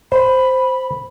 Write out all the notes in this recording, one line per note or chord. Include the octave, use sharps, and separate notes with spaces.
C5 B5